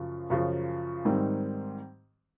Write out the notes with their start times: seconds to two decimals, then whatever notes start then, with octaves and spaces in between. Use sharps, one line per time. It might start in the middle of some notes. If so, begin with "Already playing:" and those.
Already playing: F#2 C#3 F3
0.30 F#2 C#3 F3
1.05 G#2 D#3 G3 C4